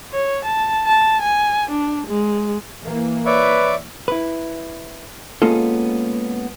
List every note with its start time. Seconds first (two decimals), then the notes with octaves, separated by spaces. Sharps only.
0.13 C#5
0.45 A5
0.86 A5
1.22 G#5
1.71 D4
2.07 G#3
2.83 E3 A#3
3.26 B4 C#5 D5 E5
4.08 E4 B4
5.42 G#3 A#3 B3 C#4 F4 A4